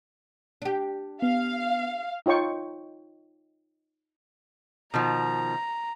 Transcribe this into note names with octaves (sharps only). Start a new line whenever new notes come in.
D4 G4
B3 F5
D#4 F4 C#5 G5 C#6
B2 D#3 F3 A#5